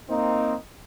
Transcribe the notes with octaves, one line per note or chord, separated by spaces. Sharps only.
A#3 C4 D#4